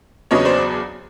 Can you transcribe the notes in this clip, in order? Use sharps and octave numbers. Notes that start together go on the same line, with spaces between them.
E2 C#3 F#3 B3 D4 C#5 D#5
C5 D5